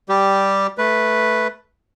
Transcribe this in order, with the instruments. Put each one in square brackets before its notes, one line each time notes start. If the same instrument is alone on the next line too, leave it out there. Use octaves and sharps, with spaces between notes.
[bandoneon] G3 G4
A3 B4